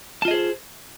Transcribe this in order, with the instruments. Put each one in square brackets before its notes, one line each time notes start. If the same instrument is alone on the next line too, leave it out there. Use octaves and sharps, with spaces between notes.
[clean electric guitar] A5
F4
D#5
G#4
C5